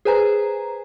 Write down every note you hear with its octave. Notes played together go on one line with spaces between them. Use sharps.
G#4 B4 C5 G#5 A#5